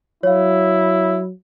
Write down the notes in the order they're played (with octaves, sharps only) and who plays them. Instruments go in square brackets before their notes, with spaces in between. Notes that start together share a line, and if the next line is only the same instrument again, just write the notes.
[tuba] F#3 [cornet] E4 [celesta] C#5 F5